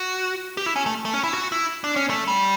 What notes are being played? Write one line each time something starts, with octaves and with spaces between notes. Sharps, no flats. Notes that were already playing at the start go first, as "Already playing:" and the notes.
Already playing: F#4
G4
E4
C#4
A3
A3
C#4
E4
F#4
E4
D4
C#4
A3
G3